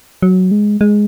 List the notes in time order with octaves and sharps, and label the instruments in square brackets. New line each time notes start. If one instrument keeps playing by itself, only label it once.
[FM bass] F#3
G#3
G#3